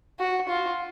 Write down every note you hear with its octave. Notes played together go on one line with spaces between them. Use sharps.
F#4
F4